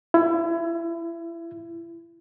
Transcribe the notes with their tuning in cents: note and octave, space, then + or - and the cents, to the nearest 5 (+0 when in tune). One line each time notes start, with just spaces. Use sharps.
E4 +30